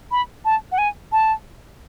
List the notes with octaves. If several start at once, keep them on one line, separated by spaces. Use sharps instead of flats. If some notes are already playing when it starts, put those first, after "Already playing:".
B5
A5
F#5
G#5
A5